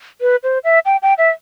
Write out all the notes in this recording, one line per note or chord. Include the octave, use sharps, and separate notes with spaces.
B4
C5
E5
G5
G5
E5